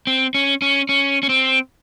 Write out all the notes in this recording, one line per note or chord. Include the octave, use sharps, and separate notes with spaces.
C4
C#4
C#4
C#4
C#4
C4